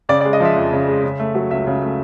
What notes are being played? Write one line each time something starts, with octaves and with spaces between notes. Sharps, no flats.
C#3 D5
G#3 D5
D#5
F3 E5
F2
C#3
G#3
C#3
A3
F#3
C#2 E5
C#3
A3